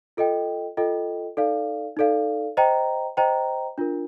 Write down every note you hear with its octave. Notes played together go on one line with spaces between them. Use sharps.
F4 A4 D#5 G5
F4 A4 D#5 G5
D#4 A4 D5 F5
D#4 A4 D5 F5
C5 D#5 G5 A#5
C5 D#5 G5 A#5
D4 F4 A#4